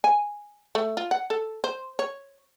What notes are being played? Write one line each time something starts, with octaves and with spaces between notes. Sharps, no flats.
G#5
A3
F4
F#5
A4
C5
C#5